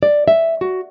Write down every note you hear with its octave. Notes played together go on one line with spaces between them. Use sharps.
D5
E5
F#4